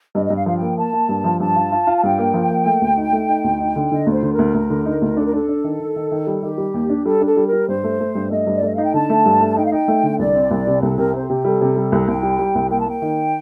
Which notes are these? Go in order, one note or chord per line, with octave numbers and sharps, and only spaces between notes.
G2 D#5
D#5
G2
F5
F3 F5
G5
A#3
A#3 A5
A#3
G2
F3
G2 A5
F4
F4
F4
A5
G2 G5
A#3
F3
A#3
A3
D2
D#4
A3
D#4
D2
D#4
D3
D3 D#5
D2 D5
C5
D3
A#4
D2
D2
D3
D#4
D2
D4 A4
A#4
D4 A4
D4
D#3
D#3
D#3
D#3
G3
D#3 G4
G3
D#2
D4
G3 A4
D4
A4
G3
A#4
G3
G2 C5
A3
A3
G2
A3 D#5
G2
D5
A3 D#5
D#4 F5
G5
D3 A5
A3
G2
A3
D#4 G5
F5
D#4 G5
A3
D3
C2 D5
C4
C2
C3
C2 A4
C3 A#4
C4 C5
A4
C3 G4
G3 A4
C3
G3
C2
C2 G5
G3
G3
C2
A#3 G5
A5
A#3 G5
D#3